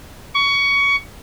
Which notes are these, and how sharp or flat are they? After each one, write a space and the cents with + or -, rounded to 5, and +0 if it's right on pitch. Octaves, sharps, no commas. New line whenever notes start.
C#6 +20